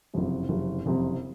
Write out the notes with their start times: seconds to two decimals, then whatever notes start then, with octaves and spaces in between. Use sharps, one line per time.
0.14 F#1 F2 C3
0.49 F#1 F2 C3
0.86 F#1 F2 C3